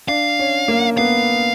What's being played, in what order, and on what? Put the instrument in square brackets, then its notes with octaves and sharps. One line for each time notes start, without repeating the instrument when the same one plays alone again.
[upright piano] D4 [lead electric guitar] F5
[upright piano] C#4
A#3
[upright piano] B3 [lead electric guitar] F5